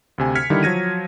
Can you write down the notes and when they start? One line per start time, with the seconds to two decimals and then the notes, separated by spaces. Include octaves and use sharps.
0.18 D2 C3 G#5
0.35 F6 G#6 B6 C#7
0.50 D3 D#3 G3 E4
0.63 F3 F#3 G#6 A#6 D#7